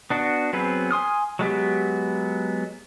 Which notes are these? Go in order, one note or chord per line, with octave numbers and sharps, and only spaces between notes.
B3 D4 F#4
F#3 B3 C4 G#4 B4
G#5 C6 D#6 F6
F#3 G#3 B3 G4